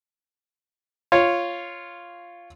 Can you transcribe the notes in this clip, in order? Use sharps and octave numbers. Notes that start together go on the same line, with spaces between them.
F4 C#5